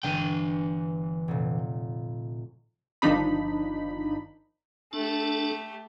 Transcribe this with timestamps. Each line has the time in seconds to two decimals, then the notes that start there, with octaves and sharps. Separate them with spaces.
0.03 G1 E3 D4 G5 D#7
1.28 F1 A#2
3.02 G1 D#3 F3 D4 D#4 B5
4.93 A3 D4 G4 A4